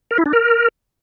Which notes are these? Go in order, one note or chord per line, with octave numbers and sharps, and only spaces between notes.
A#4
E4
D4
A#4